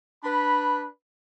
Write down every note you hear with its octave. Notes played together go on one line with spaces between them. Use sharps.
D4 B4 B5